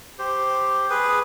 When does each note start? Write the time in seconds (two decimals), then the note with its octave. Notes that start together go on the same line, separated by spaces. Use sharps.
0.19 G4 C5
0.90 G#4 B4